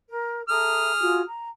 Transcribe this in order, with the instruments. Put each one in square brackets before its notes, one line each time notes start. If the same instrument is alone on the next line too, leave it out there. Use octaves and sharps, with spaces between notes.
[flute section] A#4
[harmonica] G#4 D#6 F6 [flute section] A4 E5 A#5
[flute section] F4 F#4 G#5
A#5